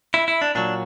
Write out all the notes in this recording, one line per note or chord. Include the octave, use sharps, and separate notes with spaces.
E4
E4
D4
A#2 F#3 D4